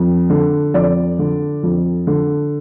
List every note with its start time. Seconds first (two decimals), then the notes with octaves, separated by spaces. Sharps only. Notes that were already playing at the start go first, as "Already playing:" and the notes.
Already playing: F2
0.30 D3
0.74 F2 D5
1.19 D3
1.63 F2
2.07 D3